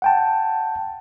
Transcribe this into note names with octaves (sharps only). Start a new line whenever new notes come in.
F#5 G5 A5